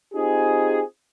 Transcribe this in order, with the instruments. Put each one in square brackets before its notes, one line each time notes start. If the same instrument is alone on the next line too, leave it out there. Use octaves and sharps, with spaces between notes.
[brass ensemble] C4 D#4 F4 G4 G#4